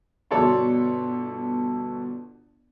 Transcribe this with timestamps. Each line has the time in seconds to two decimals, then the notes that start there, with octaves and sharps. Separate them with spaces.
0.31 G1 B2 A4 C#5 D5 C6